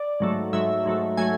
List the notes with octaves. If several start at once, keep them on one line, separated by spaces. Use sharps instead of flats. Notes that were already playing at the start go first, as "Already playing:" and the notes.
Already playing: D5
G#2 F#3 A3
G#2 F#3 A3 E5
G#2 F#3 A3
F#3 A3 G#5